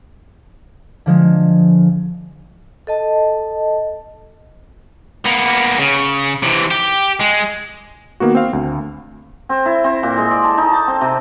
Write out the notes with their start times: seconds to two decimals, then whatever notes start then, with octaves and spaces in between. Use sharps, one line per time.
1.06 D3 F3 G#3
2.87 A4 D#5 A5
5.26 A#3 B3
5.79 C#3
6.43 C3 E3
6.71 G4
7.20 G#3
8.20 D#3 A#3 B3 F#4
8.35 C4 F5
8.53 D2
9.49 C4
9.66 E4
9.84 C4
10.03 A#2
10.17 G#3
10.31 D5
10.44 A5
10.58 D#4
10.72 A5
10.88 C4
11.01 C3